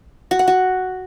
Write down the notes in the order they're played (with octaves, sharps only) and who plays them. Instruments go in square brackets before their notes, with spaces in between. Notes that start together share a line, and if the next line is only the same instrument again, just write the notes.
[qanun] F#4
F#5
F#4